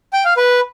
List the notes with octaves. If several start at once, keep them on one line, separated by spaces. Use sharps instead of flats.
G5
F5
B4